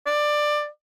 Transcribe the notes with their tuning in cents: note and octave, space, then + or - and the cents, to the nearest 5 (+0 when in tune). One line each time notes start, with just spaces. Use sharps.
D5 +15